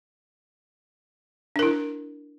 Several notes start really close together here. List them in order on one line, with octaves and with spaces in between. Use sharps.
D4 A#4 E4